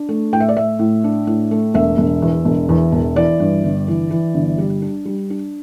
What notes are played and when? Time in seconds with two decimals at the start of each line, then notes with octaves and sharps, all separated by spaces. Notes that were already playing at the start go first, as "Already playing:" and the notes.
Already playing: D4
0.09 A3
0.33 A2 G5
0.40 E5
0.49 D5
0.56 A3 E5
0.79 A2
1.04 D4
1.27 A2
1.51 A3
1.74 E1 E5
1.98 E1
2.22 E2
2.45 E1
2.69 E2
2.92 E1
3.16 E3 D5
3.40 G2
3.64 G1
3.88 E3
4.11 E3
4.35 G1
4.58 G3
4.82 D4
5.05 G3
5.30 D4